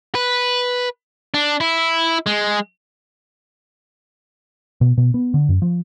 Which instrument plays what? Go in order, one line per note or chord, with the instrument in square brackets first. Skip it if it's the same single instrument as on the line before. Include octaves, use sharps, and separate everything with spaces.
[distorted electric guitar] B4
D4
E4
G#3
[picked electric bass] B2
B2
B3
D3
F#2
F3